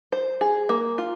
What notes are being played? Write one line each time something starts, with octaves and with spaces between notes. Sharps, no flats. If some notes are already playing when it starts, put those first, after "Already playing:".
C5
G#4
A#3
F4